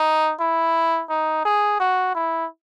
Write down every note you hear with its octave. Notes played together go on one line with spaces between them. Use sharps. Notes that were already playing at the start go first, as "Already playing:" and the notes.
Already playing: D#4
E4
D#4
G#4
F#4
E4